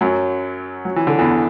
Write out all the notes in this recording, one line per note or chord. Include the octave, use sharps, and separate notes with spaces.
F#2 F#3
F#3
E3
D3
E2 E3